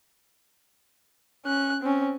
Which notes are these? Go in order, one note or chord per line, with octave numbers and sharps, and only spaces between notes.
C#4 F#6
C4 C#4